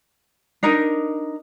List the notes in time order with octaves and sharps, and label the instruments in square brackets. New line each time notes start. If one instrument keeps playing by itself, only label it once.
[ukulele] D4 D#4 A#4